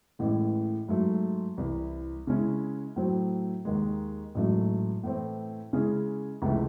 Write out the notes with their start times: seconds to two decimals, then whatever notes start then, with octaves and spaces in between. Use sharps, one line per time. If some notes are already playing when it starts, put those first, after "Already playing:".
0.19 A1 A2 E3 G#3
0.88 G#2 F#3 A3
1.58 C2 C3 E3
2.27 C#3 G#3 C#4 E4
2.96 A2 F#3 C4
3.65 D#2 D#3 G#3
4.35 A1 G#2 F#3 A3
5.04 A2 E3 A3 C4
5.73 C#3 G#3 C#4 E4 G#4
6.42 C#2 C3 E3 A3